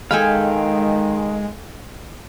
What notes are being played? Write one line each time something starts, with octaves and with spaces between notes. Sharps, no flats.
D#3 G#3 A4 F5 G5 G#5 B5